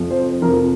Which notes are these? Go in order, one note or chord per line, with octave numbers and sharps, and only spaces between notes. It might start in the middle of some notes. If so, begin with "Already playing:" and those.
Already playing: F2 C3 F3
C5
F2 C3 F3 A#4